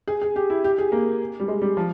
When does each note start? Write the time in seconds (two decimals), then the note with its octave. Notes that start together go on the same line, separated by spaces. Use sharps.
0.08 G#4
0.22 G#4
0.36 G4
0.50 E4
0.64 G4
0.79 G#4
0.92 A#3
1.40 G3
1.48 G#3
1.62 G3
1.77 F3